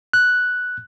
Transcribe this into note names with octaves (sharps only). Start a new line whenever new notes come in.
F#6